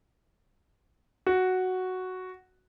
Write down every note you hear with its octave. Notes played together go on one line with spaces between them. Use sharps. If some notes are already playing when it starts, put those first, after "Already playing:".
F#4